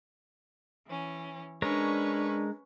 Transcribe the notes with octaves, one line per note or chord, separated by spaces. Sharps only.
E3 C#4
G#3 C#4 D4 A#4 B4 C#5 C#6